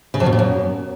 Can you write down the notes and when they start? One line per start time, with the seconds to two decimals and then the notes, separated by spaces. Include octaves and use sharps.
0.14 C#3
0.20 F2
0.26 B2
0.33 A#2
0.39 F#2